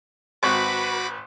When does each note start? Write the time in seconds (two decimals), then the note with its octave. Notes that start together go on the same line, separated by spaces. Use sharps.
0.43 G#1 F#4 B4 B5 C#6 D6